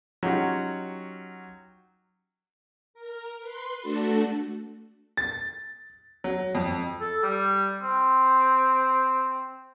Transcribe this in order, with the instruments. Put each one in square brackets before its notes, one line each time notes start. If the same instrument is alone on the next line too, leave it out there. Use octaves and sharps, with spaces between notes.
[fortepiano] F#3 C#4 D#4 F4 G4 F#5
[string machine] A#4
B4 C6
A3 D4 F#4 A4
[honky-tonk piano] A6
F#3
F2
[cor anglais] A4
G3
C4